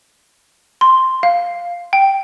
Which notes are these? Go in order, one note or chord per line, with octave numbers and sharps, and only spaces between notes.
C6
F5
G5